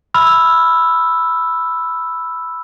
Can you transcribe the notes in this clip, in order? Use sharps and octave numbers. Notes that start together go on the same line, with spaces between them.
B5 E6 F6